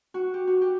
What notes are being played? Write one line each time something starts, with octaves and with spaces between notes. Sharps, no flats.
F#4
G4
F#4
G4